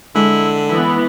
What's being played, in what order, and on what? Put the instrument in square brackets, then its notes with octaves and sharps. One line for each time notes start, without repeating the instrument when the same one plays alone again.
[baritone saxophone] D3 [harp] G#3 [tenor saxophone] E4
[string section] E3 B3 [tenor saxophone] E4